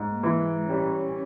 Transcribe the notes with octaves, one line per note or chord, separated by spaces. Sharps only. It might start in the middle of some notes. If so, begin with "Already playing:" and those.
Already playing: G#2
A#3
E3
G#3
G3 C#4